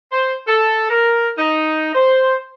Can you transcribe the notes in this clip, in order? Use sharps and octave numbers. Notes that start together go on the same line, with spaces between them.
C5
A4
A#4
D#4
C5